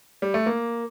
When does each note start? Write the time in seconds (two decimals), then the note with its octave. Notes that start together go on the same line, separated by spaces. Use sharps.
0.22 G3
0.34 A3
0.46 A#3